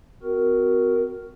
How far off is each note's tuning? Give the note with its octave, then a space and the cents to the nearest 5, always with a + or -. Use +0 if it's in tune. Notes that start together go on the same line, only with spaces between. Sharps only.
C4 -40 F#4 +0 A#4 +0